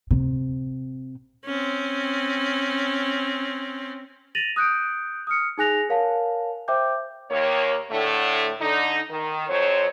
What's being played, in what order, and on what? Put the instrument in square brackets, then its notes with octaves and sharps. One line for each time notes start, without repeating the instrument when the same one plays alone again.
[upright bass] C3
[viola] C4 C#4
[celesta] A6 A#6 D#7 F7 F#7
D#6 F#6 G6 C#7 D7
D#6 F6 C#7
D#4 G#4 G#5 F#6 A#6 F7
A#4 C#5 F5 G#5 A5
C5 E5 G5 D6 G6
[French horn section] D#2 A#3 C#5
A2 D3 A3
D3 D#4
D#3
F2 F#3 C5 C#5